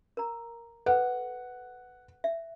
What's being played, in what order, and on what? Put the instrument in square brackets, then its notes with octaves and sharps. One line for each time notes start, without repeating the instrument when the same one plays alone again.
[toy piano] A#4 A#5
[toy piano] A4 B4 [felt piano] F#5
[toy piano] E5